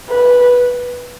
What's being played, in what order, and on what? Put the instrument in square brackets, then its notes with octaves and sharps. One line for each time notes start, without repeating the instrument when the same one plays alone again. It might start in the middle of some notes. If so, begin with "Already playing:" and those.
[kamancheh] B4